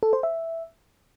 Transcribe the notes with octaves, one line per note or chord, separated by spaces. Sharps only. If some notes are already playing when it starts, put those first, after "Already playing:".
A4
C5
E5